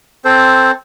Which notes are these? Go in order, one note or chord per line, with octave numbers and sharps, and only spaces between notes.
C4 A4 C5